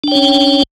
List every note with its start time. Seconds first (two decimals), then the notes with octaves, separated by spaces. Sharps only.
0.04 D4
0.08 G5
0.11 C#5
0.15 C#4